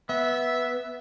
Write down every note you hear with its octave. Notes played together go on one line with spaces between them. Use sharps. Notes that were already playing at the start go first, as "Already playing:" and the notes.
B3 E5